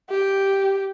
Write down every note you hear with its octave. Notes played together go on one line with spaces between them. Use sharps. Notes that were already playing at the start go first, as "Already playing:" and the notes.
G4